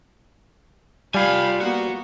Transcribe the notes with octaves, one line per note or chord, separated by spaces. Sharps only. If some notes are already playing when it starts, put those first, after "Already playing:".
G3 F4 F5 G#5 B5
A#3 B3 F#4